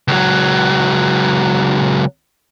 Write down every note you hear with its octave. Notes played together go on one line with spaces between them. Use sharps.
C#2 F#3